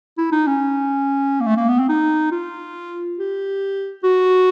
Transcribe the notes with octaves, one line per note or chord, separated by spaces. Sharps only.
E4
D#4
C#4
A#3
A3
A#3
B3
C4
D#4
F4
G4
F#4